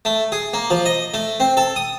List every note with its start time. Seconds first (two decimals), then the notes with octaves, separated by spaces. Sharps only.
0.05 A3
0.32 G#4
0.53 A#3
0.70 F3
0.86 D#5
1.14 A3
1.40 C4
1.57 A4
1.76 D#6